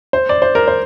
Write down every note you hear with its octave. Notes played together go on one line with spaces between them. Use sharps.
C5
D5
C5
A#4
C5